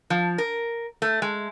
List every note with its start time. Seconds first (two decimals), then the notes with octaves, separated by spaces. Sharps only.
0.10 F3
0.38 A#4
1.02 A3
1.22 G#3